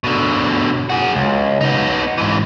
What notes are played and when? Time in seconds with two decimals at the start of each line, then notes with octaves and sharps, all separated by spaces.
0.04 B2 D3
0.90 F#4 G#4
1.15 C#2
1.61 B3 D#4
2.18 G#2 E3